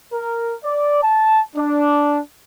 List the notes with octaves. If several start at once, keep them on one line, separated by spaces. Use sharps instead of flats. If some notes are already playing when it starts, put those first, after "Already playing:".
A#4
D5
A5
D4